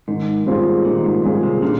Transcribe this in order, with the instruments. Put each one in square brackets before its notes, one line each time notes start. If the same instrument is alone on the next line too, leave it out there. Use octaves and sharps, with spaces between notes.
[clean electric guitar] G#2 [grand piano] D#3
[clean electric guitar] G#2 [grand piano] G3 C4 F4 G#4
[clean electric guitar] A#2 [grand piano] D#3
[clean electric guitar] G#2
[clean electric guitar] G#2 [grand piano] G3 C4 F4 G#4
[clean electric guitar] C3
[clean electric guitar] A#2 [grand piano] D3